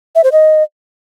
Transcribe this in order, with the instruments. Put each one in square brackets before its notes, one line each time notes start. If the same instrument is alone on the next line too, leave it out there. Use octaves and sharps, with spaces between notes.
[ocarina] E5
C5
D#5